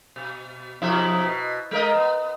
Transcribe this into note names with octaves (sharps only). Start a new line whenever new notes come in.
B2
F2 C3 E4
B2
G#3 A#4 D#5
B3